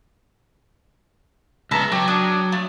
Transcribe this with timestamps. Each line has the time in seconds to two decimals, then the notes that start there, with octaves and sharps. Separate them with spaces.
1.71 C#2 B3 E5 A5 A#5
1.92 F#3 G4
2.08 D4 D#6
2.52 A3